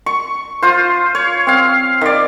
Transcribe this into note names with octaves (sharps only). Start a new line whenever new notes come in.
C#6
F4 C5
C#5
C4 F5
D#3 D5